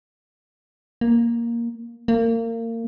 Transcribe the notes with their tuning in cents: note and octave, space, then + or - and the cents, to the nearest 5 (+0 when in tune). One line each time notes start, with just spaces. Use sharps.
A#3 +5
A#3 -30